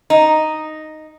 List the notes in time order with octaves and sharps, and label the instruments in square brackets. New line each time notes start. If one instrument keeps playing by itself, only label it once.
[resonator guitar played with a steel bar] D#4